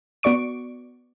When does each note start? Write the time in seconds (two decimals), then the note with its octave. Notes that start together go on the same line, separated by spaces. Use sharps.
0.23 B3 F#4 D5 C#6 D7